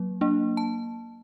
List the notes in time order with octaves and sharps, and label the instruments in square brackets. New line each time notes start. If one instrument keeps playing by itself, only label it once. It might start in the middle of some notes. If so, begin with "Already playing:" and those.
Already playing: [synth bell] F#3 A#3
A#3 D4
A5